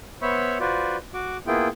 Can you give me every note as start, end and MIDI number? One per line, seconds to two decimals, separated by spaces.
0.22 0.58 59
0.22 0.58 72
0.22 0.58 73
0.22 0.58 76
0.22 0.58 83
0.22 0.58 85
0.60 0.97 65
0.60 0.97 66
0.60 0.97 71
0.60 0.97 72
0.60 0.97 74
1.14 1.37 66
1.14 1.37 86
1.47 1.68 58
1.47 1.68 59
1.47 1.68 64
1.47 1.68 65
1.47 1.68 68
1.47 1.68 79